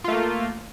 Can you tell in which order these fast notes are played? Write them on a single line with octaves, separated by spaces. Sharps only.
F4 A3 A#3